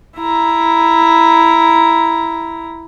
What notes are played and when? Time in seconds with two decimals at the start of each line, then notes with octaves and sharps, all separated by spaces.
0.17 E4 A#5